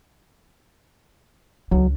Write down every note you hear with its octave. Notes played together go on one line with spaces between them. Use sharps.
C#2 F#3 D4